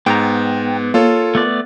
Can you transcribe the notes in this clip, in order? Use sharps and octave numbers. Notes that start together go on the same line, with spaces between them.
G#2 B3 G5 A#5
A#3 F4 A4 C#5
A3 B3 D5